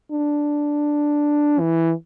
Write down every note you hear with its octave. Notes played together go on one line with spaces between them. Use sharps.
D4
E3